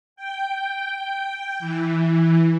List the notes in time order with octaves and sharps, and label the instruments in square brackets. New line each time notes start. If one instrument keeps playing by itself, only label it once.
[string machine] G5
E3